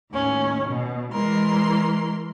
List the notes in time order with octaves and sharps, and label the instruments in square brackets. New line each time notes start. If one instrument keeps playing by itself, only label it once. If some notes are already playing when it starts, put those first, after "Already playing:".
[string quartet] D#2 A2 C#4
B2
E3 G#3 A#4 C6